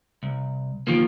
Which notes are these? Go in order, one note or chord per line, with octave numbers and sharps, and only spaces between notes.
C2
D#3 F3 A#3